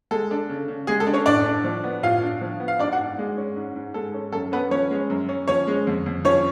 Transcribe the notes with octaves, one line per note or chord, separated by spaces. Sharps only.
G#3 A4
D4
C#3
C#3
G#3 G#4
A4
D4
C#4 C#5
A2 D4 D5
D4
F3
B3
A2 F4 F5
D4
F3
B3
F5
G#2 D4 D5
F#4 F#5
G#2
G#3
C#4
G#2
G#2
G#3 A4
C#4
F#2 A4
B3 C#4 B4
F3 C#4 C#5
G#3
F#2
C#4
F3 C#4 C#5
G#3
F2
F2
F3 C#4 C#5